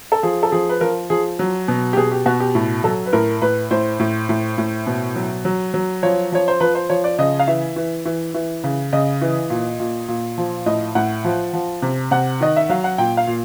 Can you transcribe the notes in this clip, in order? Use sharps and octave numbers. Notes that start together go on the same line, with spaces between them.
A4
F3 G#4
A4
F3 G#4
B4
F3 A#4
F3 G#4
F#3
B2
G4
B2 G#4
G4
B2 F#4
G4
A2
F#3 A4
B4
A2 A#4
A2 B4
A2 C5
A2
A2
A2
B2
F#3
F#3
F#3
F3 C#5
F3 C#5
C5
F3 B4
C5
F3 C#5
D5
C#3 D#5
F5
E3 E5
E3
E3
E3
C#3
C#3 D#5
E3
A#2
A#2
A#2
F3
A2 D#5
A2 F#5
F3
F3
C3
C3 F#5
D#3 D#5
E5
F#3 F5
F#5
A#2 G5
F5
A#2